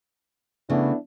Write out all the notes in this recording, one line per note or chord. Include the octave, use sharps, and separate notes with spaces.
C#3 A3 B3 D4 E4